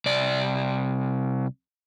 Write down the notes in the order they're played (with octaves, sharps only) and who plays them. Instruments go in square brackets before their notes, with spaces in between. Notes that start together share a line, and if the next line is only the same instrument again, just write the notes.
[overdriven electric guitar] C2 D5